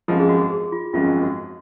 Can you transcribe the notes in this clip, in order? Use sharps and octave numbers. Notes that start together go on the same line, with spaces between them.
G#1 F#2 F3 G#3 F4
G#4
F#4
G#4
F4
G#1 F#2 F3 G#3 F4
F#4